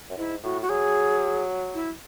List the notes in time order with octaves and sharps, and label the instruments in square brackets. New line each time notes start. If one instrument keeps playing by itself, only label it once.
[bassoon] F#2
[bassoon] G#2 [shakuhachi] E4
[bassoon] A2 [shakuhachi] F#4
[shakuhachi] F#4
[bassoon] F#3 [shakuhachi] G#4
[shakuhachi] E4